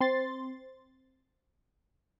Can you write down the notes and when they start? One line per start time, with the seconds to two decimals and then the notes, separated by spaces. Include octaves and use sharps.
0.01 C4 C6 A6